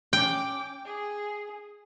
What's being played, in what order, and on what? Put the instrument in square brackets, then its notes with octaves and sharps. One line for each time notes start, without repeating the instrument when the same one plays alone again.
[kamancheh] C#4 D6 [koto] G5
[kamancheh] G#4